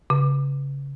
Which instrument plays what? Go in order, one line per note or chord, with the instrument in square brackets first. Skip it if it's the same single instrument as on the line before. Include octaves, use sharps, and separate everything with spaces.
[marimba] C#3